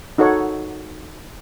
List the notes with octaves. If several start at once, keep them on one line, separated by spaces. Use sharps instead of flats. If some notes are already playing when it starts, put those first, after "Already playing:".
D#4 F#4 A4 C#5 F#5